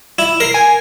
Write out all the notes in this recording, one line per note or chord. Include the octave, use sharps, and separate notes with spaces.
E4
A#4 C7
G#5